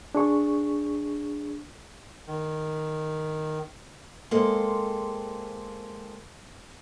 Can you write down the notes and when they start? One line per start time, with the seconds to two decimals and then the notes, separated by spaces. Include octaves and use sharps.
0.15 D4 G#4 C#6
2.27 D#3
4.31 G#3 A#3 C4 G#4 A4